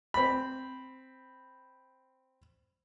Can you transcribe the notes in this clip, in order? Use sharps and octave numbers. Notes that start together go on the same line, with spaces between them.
C4 B5